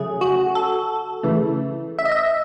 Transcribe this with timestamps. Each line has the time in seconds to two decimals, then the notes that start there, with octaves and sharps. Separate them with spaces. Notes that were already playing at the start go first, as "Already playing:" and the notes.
Already playing: C#3 F#3 A3 G#4
0.21 F#4
0.55 A4
1.23 C#3 E3 A3
1.99 E5
2.05 D#5
2.12 E5